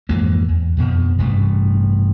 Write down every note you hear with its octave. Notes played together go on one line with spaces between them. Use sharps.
F2 G#2 E3 A#3
E2
F2 B2 F3
A1 G2 C3 A3